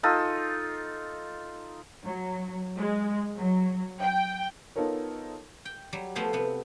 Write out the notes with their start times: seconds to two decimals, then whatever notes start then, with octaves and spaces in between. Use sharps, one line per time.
0.03 D#4 F4 A4
2.04 F#3
2.77 G#3
3.38 F#3
4.02 G5
4.76 B3 D#4 F4 A4 A#4 C#5
5.65 G5
5.93 F#3 G3
6.15 F3 A3 B3 C5 F5 G#5
6.33 C3 B3